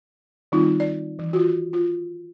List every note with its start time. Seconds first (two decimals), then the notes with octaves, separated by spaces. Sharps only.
0.52 D#3 G3 C4 D#4 F4
0.80 D5
1.19 E3
1.33 F4 F#4
1.73 F4